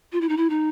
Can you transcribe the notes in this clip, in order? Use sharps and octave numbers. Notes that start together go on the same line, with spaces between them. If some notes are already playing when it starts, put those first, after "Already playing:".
F4
E4
D#4
E4
D#4